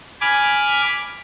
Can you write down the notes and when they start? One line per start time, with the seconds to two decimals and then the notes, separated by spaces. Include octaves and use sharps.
0.21 G#5 B5 D6 F6